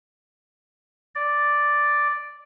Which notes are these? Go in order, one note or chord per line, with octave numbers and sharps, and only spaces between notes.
D5